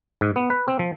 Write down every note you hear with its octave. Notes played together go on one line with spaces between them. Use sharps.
G#2
B3
B4
C4
F3